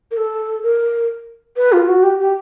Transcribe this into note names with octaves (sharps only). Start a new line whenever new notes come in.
A#4
A4
A#4
B4
F4
F#4
G4
G4